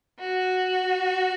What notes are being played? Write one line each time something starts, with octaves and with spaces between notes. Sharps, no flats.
F#4